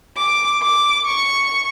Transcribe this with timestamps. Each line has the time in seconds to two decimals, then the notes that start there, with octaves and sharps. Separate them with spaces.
0.17 D6
0.62 D6
1.06 C#6